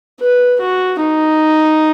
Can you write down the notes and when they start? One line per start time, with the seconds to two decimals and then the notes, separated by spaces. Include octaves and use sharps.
0.20 B4
0.60 F#4
1.00 D#4